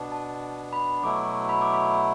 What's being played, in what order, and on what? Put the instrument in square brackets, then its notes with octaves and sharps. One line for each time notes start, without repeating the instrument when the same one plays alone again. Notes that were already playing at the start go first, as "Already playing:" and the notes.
Already playing: [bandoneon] B2 B3 D4
[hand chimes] A5
B5
[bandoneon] B2 F#3 A3 E4 [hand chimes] D6
[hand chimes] B5
D6
B5